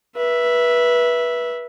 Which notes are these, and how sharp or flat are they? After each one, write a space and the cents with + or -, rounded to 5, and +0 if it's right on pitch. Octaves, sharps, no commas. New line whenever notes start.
B4 -25 E5 +0